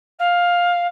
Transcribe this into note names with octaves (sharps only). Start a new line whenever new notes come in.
F5